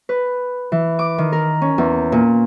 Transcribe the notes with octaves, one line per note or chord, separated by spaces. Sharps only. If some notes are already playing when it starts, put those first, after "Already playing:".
B4
E3
D6
D#3
A#4
C#4
E2
A#2